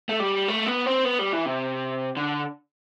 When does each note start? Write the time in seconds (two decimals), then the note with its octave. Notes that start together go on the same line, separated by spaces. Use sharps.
0.09 A3
0.20 G3
0.48 A3
0.66 B3
0.86 C4
1.05 B3
1.19 G3
1.33 E3
1.46 C3
2.17 D3